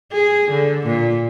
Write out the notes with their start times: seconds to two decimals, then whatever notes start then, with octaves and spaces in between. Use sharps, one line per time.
0.13 G#4
0.51 D3
0.87 A#2